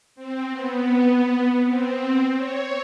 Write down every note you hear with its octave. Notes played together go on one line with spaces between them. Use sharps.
C4
B3
C4
C#5